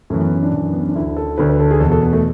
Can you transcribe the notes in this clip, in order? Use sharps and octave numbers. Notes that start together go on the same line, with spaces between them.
F#2 E3 A3
B3
C#4
D4
F#2 E3
B3
C#4
D4
D2 D3 E4
A4
D2 D3 B4
B4
A4
G#4
E2 B2 A4
A4
B3
A3